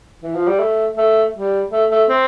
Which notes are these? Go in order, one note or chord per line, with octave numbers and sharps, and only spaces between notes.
E3
F3
G3
A3
A3
G3
A3
A3
C4